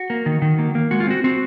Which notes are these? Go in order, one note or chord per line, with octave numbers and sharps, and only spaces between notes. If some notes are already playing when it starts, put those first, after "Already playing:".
Already playing: F#4
A#3
D#3
D#3
A#3
A#3
G#3 F#4
F4
C4 F#4
C4 F#4